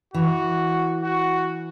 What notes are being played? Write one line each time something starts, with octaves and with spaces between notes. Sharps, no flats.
E3 F#4
F#4